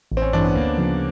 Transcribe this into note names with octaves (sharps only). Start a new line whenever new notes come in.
A1
C4
C#4
G2 E3 D4
B3
D2 A#3
C#3 F3